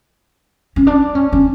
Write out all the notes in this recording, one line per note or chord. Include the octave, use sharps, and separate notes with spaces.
C#4
D4
C#4
C#4